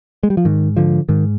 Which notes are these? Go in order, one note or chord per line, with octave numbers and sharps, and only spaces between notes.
G#3
G3
F3
G#2 D#3
D3 F3
G#2 D#3